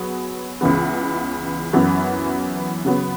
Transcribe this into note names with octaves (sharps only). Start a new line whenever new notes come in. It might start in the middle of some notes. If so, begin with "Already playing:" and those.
Already playing: F#3 B3 G#4
C#2 C#3 E3 B3
F#2 E3 B3 F#4
C#3 F#3 B3